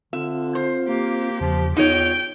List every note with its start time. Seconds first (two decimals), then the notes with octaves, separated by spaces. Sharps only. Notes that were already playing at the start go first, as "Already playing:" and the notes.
0.13 D3 C4 F4 E5
0.55 C5
0.88 A#3 G4
1.41 E2 C#3 F3
1.77 E2 D#4 F4 C#5 G5